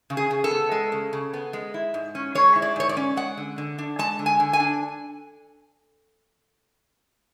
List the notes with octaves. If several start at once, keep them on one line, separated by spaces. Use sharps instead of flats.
C#3
G#4
C#3
A4
B3
G#3
C#3
C#3
B3
G#3
E4
G#2
C#4
G#3 C#5
E4
D5
G#2 C#5
D5
C#4
G#3 F#5
D3
D3
D4
G#3 A5
D3
G#5
D3
G#5
D4